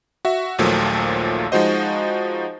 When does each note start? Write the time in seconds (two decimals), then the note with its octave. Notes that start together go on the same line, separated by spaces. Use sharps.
0.25 F#4 E5
0.58 A#1 D#2 A#2 F3 F#3 A3
1.52 F3 G#3 D#4 F#4 C5 D#5